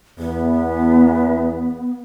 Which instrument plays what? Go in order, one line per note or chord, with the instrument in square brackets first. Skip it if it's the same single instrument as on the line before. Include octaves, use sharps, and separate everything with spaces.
[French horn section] E2 [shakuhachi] B3